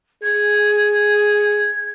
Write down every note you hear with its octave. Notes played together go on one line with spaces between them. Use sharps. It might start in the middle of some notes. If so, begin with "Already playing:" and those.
G#4 G#6